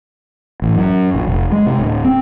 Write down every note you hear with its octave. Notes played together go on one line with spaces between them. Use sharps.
A1
F#2
A#1
F1
G#3
C3
D1
C4